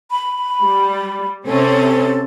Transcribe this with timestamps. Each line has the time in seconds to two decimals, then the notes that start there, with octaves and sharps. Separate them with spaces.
0.11 B5
0.62 G3
1.46 C3 C4 C#4 A4